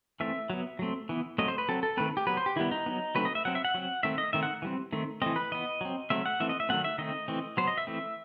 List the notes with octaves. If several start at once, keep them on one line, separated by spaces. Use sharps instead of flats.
E3 A3 C4 E5
F#3 B3
F#3 A3 C4
E3 B3
F#3 A3 C4 D#5
C5
B4
F#3 C4 A4
A4
D#3 A3 C4 B4
G4
F#3 B3 B4
C5
G4
D#3 G3 B3 E4
D#4
F#3 B3
F#3 A3 C4 B4
D#5
E5
F#3 C4 F#5
E5
F#5
F#3 C4
D#3 A3 C4 E5
D#5
D#3 A3 C4 E5
F#5
E3 G3 C4
D#3 A3 C4
E3 A3 C4 D#5
B4
E3 B3 D#5
F#3 C4
F#3 A3 C4 E5
F#5
E3 A3 C4 E5
D#5
E5
D#3 F#3 A3 C4 F#5
E5
D#3 A3 C4 D#5
E3 A3 C4
F#3 B3 C5
D#5
E5
E3 A3 C4